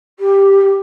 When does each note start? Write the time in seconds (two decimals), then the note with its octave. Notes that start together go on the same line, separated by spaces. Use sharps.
0.19 G4